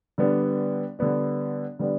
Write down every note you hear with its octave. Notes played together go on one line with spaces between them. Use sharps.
D3 G3 B3 D4
D3 G3 B3 D4
D3 G3 B3 D4